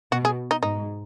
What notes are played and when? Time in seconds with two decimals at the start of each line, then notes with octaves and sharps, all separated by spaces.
0.12 B2 F#4
0.25 G#4
0.51 D#4
0.63 G#2 D#4